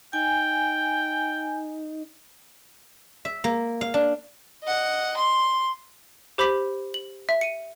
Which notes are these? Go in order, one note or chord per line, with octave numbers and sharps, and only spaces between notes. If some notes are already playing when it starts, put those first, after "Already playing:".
D#4 G5 G#5
E5
A#3
F5
D4
D#5 F#5
C6
G4 C5 B5 D6 B6 F#7
F#7
E5
C#7 D#7